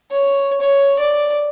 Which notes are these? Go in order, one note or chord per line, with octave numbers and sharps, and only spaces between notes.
C#5
C#5
D5